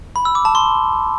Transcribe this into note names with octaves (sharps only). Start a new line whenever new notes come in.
B5
E6
D6
A5
C6